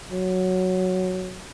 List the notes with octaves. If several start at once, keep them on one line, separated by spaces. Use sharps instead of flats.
F#3